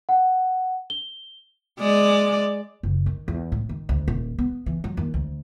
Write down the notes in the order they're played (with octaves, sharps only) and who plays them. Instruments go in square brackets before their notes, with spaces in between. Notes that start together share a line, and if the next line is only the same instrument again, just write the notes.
[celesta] F#5
G7
[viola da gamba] G#3 D5
[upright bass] F#1
D#3
E2
A2
D#3
D2
D#1
B3
E3
F#3
D#2
D2